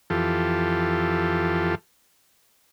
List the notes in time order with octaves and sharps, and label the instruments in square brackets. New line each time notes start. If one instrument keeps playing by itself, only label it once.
[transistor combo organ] F2 E3 F4 G4 A4